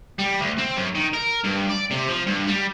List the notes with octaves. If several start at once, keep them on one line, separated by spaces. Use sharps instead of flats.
G3
D2
C4
F#2
D#3
A#4
G2
D5
C3
F3
G2
G3